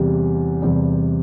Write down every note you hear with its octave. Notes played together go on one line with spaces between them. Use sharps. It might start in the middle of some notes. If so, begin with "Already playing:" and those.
Already playing: E2 C3 G3
E2 C3 G3